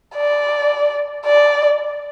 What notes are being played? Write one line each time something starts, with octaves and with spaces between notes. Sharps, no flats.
D5
D5